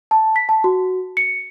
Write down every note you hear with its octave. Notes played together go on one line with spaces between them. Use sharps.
A5
B6
A5
F#4
C#7